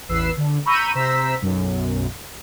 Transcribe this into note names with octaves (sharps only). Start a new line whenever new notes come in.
A1 E2 B4 E6 C7
D3
A#5 B5 C#6 E6 G6 D#7
C3 C5 A#5 E6 B6
B1 F#2